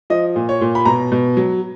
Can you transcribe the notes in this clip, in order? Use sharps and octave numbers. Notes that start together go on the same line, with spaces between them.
F3 D#5
A#2
C#5
A#2
B5
B2 A#5
B2
F#3